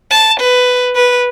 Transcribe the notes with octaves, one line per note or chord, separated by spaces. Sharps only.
A5
B4
B4